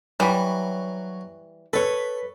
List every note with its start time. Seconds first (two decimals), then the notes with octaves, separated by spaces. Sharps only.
0.20 E3 F#3 G3
1.73 A4 B4 C#5